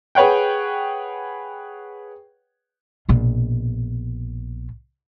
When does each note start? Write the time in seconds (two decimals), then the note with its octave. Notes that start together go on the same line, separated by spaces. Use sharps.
0.15 G#4 B4 C#5 F#5 G5
3.09 A#1 B2